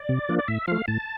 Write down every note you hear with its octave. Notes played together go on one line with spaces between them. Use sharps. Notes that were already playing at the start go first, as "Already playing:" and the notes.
Already playing: D5
C3
F3 A#3 D4
D5
A2 E5
F3 A3 F5
A2 A5